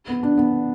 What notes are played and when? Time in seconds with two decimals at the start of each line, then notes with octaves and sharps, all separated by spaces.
0.08 B3
0.23 D4
0.37 B3